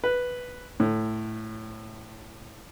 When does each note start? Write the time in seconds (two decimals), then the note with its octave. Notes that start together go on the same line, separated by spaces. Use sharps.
0.04 B4
0.80 A2